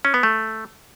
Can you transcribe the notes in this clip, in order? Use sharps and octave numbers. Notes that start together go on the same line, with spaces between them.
C#4
B3
A3